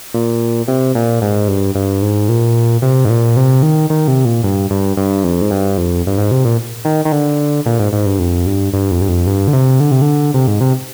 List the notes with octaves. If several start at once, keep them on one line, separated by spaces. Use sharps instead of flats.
A#2
C3
A#2
G#2
G2
G2
G#2
A#2
C3
G#2
A#2
C3
D#3
D#3
C3
A#2
G2
G2
G2
F2
G#2
G2
F2
G2
G#2
C3
A#2
D#3
D#3
D3
A#2
G#2
G#2
G2
F2
G2
G2
F2
G2
F2
G2
D3
C3
D3
C3
D3
C3
G#2
C3